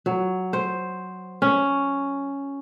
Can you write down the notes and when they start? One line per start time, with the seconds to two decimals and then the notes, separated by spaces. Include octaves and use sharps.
0.06 F#3
0.53 C5
1.42 C#4